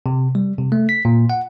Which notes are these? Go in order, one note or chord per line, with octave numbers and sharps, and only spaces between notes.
C3
G3
C3
A3
B6
A#2
F#5